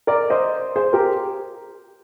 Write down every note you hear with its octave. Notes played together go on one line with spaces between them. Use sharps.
A#4 D5
C5 D#5
G#4 C5
G4 A#4